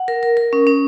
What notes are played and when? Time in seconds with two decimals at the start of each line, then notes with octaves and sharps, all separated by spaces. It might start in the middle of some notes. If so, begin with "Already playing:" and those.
Already playing: F#5
0.08 A#4
0.23 A#4
0.37 A#4
0.53 C#4
0.67 C#4